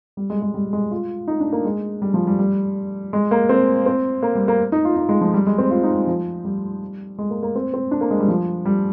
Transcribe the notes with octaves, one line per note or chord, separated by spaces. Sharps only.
G3
G#3
G#3
G3
G#3
F4
D#4
D4
A#3
G#3
G3
F3
G3
G3
G#3
A#3
C4
C4
A#3
G3
A#3
D#4
F4
D#4
G#3
F3
G3
G#3
C4
F4
D#4
G3
F3
G3
G#3
A#3
A#3
C4
C4
D4
A#3
G#3
G3
F3
G3